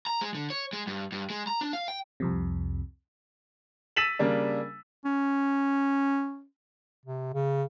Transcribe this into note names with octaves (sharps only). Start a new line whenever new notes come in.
A#5
G#3
D3
C#5
G#3
G2
G2
G#3
A#5
D4
F5
G5
C2 F2 C3
E6 A6 B6 D#7 E7 F#7
C#3 G3 A#3 D4
C#4
C3
C#3